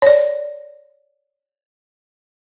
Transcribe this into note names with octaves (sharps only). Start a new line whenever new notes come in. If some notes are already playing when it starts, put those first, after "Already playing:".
C#5 D5